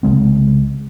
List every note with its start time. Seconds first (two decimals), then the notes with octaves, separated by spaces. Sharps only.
0.03 C2 C#3 G#3 C4